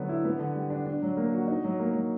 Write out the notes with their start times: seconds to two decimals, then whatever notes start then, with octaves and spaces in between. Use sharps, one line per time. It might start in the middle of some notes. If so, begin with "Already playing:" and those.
Already playing: D3 F#3 B3
0.09 E4
0.25 B3
0.39 D3
0.55 G3
0.70 D4
0.86 D4
1.02 F#3
1.17 A#3
1.33 F#4
1.48 D#4
1.64 F#3
1.80 A#3
1.94 F#3